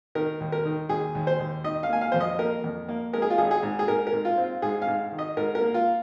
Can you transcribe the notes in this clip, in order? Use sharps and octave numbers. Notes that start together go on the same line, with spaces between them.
D#3 A#4
D#2
A#4
D#3
D#2 G#4
D#2
C5
D#2
D#3 D#5
F5
A#3 G#5
F5
F2 C5
D#5
A#3 A#4
F2
A#3
G#3 A#4
G#4
F4
G#1 G#4
G#4
G#2
G#4
G#2 A#4
A#4
G#2
F4
C4
F4
G#2 G#4
F5
G#2
D#3
D#5
G#2 A#4
A#4
A#3
F4